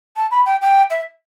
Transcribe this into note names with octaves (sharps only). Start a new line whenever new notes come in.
A5
B5
G5
G5
E5